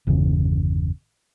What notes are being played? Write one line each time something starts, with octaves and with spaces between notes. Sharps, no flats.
G1 E2 C#3